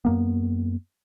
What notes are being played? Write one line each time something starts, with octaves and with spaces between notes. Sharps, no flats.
F#2 A#3 B3